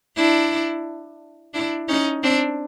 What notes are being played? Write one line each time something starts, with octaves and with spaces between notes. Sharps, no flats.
D4 E4
D4 E4
C#4 D#4
C4 D4